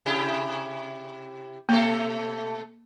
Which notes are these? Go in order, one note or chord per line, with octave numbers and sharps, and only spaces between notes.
C3 E4 G4
B2 A3 A#3 A4